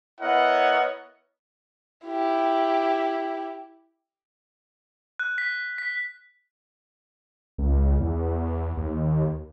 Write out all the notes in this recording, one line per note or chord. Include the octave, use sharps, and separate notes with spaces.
B3 E4 A#4 C#5 D#5 F#5
E4 G4
F#6
B6
B6
C#2
E2
D#2